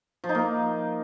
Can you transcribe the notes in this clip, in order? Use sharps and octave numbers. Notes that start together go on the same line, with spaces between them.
F3
D#4
A#3